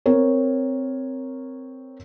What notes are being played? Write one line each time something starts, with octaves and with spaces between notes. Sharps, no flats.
C4 A#4 C#5